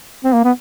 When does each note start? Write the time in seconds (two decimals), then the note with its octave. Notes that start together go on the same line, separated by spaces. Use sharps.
0.24 C4
0.34 A#3
0.44 B3